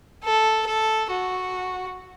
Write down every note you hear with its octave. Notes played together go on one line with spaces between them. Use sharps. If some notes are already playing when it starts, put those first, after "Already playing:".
A4
A4
F#4